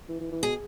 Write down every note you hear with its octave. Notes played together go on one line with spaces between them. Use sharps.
E3
E3
E3
B2 G#4